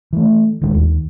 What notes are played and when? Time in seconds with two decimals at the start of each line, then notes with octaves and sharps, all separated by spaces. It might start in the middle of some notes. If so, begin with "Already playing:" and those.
0.13 E3 A3
0.61 D1 A1 D#3 G#3
0.74 D#2